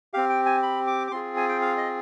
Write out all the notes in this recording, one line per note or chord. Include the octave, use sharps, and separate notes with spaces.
C4 G4 F5
G5
G#5
B5
D6
D6
C4 F4 G#4 C6
G#5
G5
F5
D#5